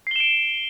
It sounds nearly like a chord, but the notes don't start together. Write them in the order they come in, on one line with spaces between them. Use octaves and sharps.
C7 G7 E7 D7